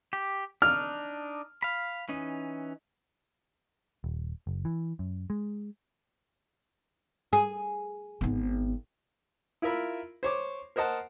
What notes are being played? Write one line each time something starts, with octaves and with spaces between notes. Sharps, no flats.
G4
D4 D#4 F6
F5 B5
E3 C#4 D#4
D#1
F#1
E3
F#2
G#3
G#4
G#1 B3
E4 F4 A#4 E5 B5
C5 C#5 D6
A#4 C5 D#5 F#5 A5